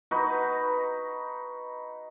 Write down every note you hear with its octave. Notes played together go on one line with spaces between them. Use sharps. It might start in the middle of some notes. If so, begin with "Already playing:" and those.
D#4 F#4 B4